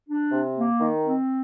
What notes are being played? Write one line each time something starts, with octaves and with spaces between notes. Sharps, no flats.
D4
C3
A#3
D#3
C4